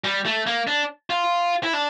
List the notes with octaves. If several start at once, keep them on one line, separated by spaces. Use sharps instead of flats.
G3
A3
A#3
D4
F4
E4
D4